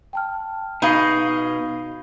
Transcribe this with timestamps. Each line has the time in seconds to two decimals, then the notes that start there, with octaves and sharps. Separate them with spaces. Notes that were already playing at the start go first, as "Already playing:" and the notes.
0.13 G5 A5 F6
0.82 B2 D#4 G#4 F5 B5 D#6